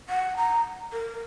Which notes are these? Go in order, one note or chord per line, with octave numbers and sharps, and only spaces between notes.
F#5
A#5
A#4